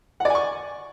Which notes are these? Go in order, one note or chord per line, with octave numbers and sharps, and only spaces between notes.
D5 F#5 G#5 C#6